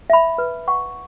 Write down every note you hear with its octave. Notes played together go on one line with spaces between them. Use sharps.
E5 B5
B4
F#5 C#6